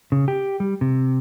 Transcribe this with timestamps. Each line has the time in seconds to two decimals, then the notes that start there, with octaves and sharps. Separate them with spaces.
0.12 C#3
0.28 G4
0.60 G3
0.81 C3